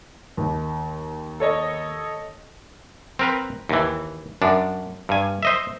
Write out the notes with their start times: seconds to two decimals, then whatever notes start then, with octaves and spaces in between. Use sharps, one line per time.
0.37 D#2
1.40 A4 C#5 D#5
3.19 C4 A#4 B4
3.69 D#2 E3
4.42 F#2 D4
5.09 G2 G#5
5.43 C5 D#5 E5